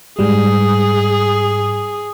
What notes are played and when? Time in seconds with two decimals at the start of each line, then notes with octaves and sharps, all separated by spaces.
0.19 G#2 G3 G#4